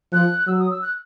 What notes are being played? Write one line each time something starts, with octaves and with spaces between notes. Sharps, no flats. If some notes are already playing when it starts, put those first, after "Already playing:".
F3 F#6
F#3 E6
D#6
E6
F#6